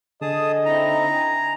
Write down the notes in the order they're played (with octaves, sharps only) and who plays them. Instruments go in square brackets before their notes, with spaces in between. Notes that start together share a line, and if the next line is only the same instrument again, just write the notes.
[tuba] D3 [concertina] G#4 A5 D#6 [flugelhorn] D#5
[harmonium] C4 D#4 E4 [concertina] A#5
[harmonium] G#5